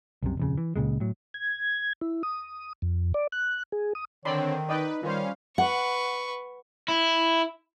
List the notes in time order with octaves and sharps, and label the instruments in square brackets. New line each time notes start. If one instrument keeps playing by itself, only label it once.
[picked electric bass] C2 F#2 C3
D#1 F2 C#3
E3
C#2 A#2 C#3 G#3
A2 F#3
[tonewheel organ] G#6
E4
D#6
F2
D5
F#6
G#4
D#6
[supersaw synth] D3 C4 [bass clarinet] D#3 [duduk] C#5 [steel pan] D5 B5 C6
[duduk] D#4 [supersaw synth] B4 [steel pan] D5 D#5 G5
[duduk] D#3 [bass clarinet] G3 [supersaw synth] C#4 F5 [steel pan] F4 C5
[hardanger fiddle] B4 C#6 [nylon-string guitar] F#5
[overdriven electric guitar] E4